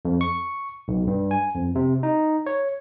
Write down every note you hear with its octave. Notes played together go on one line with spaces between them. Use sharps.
F2
C#6
B1
G2
G#5
F2
C3
D#4
C#5